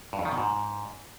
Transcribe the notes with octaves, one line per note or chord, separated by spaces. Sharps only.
G2
F2
D#3
B2
G#2